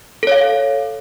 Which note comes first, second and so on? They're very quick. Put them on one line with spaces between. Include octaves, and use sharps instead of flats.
A4 C#5 F5